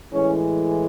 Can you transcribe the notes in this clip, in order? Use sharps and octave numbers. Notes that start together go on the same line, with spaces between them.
A2 E3 G#3 C#4